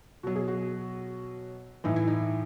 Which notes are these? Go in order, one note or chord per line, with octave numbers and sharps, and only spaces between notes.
B2 F#3 F#4
G#4
F#4
A2 E3 D#4
E4
D#4